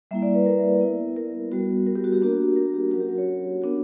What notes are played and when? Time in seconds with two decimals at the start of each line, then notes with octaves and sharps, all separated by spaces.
0.11 G3 A#3 E4 E5
0.23 D5
0.35 B4
0.46 A#4
0.81 B3 E4
1.16 A#4
1.52 G3 B3 F#4
1.87 A#4
1.95 G4
2.04 F#4
2.13 G4
2.22 A#3 D4 F#4
2.56 A#4
2.74 G4
2.91 F#3 C#4 F#4
3.00 G4
3.09 A#4
3.18 C#5
3.62 B3 D4 F#4